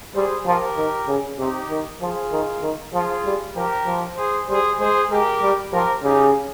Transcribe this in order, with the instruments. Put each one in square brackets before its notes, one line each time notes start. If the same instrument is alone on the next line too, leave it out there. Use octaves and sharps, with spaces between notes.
[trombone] G3 [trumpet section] G#4 C5
[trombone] F3 [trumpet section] G4 A#4
[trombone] D#3
C#3
[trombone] C3 [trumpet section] D#4 G4
[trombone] D#3
[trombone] F3 [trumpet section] F4 G#4
[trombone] D#3
D#3
[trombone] F3 [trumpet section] F4 G#4
[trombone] G3
[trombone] F3 [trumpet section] G4 A#4
[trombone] F3
[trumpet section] G#4 C5
[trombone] G3 [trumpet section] G#4 C5
[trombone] G#3 [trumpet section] G#4 C5
[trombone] G#3 [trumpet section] G4 A#4
[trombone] G3
[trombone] F3 [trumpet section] G4 A#4
[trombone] C#3 [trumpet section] D#4 G4